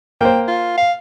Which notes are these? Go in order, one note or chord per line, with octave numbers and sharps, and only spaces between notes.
A#3 C5 G5
F4
F5